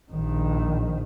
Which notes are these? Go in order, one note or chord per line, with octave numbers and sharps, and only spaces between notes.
A#1 D#3